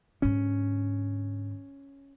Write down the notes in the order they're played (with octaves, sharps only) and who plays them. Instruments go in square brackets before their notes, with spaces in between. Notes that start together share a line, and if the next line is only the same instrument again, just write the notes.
[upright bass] G#2 D3 [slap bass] C#4